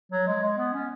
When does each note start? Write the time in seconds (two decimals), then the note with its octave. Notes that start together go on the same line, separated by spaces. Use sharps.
0.12 F#3
0.27 G#3
0.42 G#3
0.58 B3
0.73 C#4